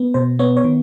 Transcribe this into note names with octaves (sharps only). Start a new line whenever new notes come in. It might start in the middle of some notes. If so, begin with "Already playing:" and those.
Already playing: B3
B2 C5
B3 C#5
C#5
D#3